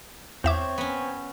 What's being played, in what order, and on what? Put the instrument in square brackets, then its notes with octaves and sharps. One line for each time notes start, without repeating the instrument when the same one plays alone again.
[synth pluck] E2 E5 D6 [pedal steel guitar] C4 C#5
[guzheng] B3 C#4